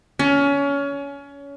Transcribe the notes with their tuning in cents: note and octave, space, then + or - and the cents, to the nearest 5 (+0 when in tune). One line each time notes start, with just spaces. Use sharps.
C#4 +25